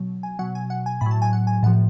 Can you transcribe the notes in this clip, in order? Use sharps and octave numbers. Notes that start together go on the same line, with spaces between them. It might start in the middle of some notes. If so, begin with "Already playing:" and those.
Already playing: B2 F#3
G#5
B2 F#3 F#5
G#5
F#5
G#5
A2 F#3 B5
A5
G#5
F#5
G#5
A2 F3 F#5